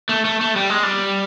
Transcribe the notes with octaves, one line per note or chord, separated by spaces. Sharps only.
A3
A3
A3
G3
G#3
G3